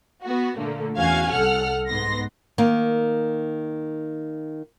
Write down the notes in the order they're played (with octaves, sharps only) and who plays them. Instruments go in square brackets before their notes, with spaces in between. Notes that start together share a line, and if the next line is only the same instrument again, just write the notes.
[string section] B3 F#4
A#2 D3 A3 A#3
E2 C#4 F#4 F5 G#5 G#6
C2 A4 F#5 F6
G#2 B3 C6 A#6
[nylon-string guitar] D#3 A#3